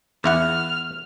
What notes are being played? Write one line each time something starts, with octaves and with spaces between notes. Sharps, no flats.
E2 E4 F#5 F6